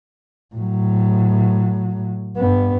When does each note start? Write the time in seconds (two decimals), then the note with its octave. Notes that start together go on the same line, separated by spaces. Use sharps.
0.56 A2 F#3
2.37 G2 B3